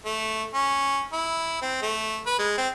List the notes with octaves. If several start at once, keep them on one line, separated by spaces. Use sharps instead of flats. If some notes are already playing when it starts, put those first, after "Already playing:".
A3
C#4
E4
C4
A3
B4
G#3
C4